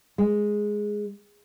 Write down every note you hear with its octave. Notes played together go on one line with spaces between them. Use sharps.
G#3